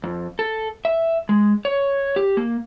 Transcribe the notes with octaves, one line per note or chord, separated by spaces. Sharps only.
F2
A4
E5
G#3
C#5
G4
A#3